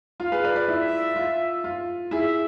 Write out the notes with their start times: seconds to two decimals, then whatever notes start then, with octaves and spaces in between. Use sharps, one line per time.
0.20 F4 F5
0.32 G#4 B4
0.44 B4 D5
0.55 B4 D5
0.67 E4 E5
1.16 F4
1.64 F4
2.11 E4 G#4 E5